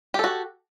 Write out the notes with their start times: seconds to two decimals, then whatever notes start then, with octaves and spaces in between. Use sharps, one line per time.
0.14 G4
0.19 A4
0.24 F#4